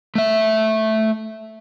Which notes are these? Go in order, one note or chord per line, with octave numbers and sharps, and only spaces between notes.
A3 E5